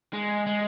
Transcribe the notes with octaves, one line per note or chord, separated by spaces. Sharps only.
G#3
G#3